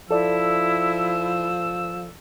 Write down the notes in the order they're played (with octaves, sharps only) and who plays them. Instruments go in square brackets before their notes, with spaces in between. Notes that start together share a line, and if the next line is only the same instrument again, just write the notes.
[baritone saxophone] F3 [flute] E4 [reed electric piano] A4 D5 [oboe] E6